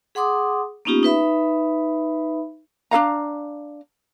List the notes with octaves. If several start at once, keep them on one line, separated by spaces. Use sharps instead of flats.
G#4 F#5 C6 D6 D#6
A#3 B3 C#4 D#4 F4 G4
D#4 B4 E5 B5
D4 G#4 F5 A#5